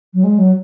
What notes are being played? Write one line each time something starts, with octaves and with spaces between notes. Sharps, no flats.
F#3
G#3
F#3